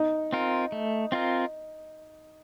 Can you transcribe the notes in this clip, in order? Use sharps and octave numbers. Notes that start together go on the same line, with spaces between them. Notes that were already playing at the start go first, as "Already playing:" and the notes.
Already playing: D#4
C4 F4 A#4
A3
C4 F4 A#4